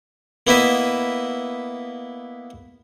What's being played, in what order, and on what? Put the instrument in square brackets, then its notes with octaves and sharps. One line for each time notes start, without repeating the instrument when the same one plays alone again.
[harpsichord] A#3 B3 E4 B4 D#5 E5